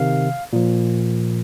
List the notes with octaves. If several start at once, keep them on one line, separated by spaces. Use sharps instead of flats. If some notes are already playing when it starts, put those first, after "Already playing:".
Already playing: C3 D#3 F5
A#2 F3